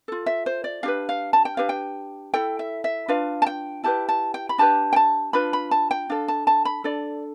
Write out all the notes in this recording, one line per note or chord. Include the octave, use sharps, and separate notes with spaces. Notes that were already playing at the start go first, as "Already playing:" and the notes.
F4 A4
E5
C5
D5
D4 G4 B4 F5
F5
A5
G5
D4 G4 B4 F5
G5
E4 A4 G5
E5
E5
D4 F4 B4 F5
A5
G5
E4 G4 B4 A5
A5
G5
B5
D4 G4 B4 A5
G5
A5
D4 F4 B4 B5
B5
A5
G5
D4 A4 F5
A5
A5
B5
D4 A4 D5